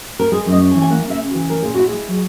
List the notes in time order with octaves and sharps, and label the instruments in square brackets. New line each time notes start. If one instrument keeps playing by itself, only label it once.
[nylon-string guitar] A#4
G#3 G#4
F#2
D#5
C#4
G#5
E3
G#5
A#3 F#5
C#3
E5
C#3
F#4
E3
C#4 A#4
A#2 G#4
E4 F#4
G#4
G#3
F#3